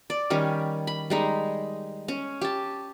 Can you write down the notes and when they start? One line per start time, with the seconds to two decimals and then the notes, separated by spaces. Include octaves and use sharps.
0.10 D5
0.30 D#3 G3 C#4
0.87 B5
1.10 G3 G#3 D#4
2.08 C#4
2.41 G4 A5